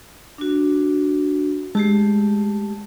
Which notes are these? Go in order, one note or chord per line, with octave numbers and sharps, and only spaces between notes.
D4 F#4
G#3 A3 G4 A5